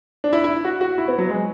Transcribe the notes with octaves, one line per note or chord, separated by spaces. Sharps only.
D4
E4
E4
F#4
F#4
E4
B3
F#3
G#3